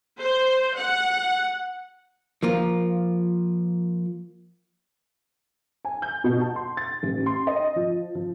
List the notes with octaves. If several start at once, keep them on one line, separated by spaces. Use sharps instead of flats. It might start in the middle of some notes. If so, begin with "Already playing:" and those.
C5
F#5
F3 A#3 F4
G#5
G6
B2
A5
C6
A6
A1
C6
D#5
F3
F3